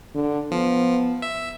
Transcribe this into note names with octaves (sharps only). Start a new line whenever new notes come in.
D3
F3 B3
E5